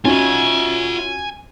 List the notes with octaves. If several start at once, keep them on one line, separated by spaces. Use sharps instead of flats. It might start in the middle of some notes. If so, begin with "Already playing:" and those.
C#4 F4 F#4 E5 G#5